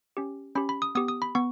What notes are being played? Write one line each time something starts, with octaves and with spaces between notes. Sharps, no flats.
C#4 G4
C#4 G4 B5
B5
D#6
B3 G4 D#6
D#6
B5
B3 C#6